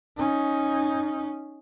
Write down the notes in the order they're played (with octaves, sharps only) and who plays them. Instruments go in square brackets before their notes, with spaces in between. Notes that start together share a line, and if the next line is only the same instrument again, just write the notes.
[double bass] C#4 D#4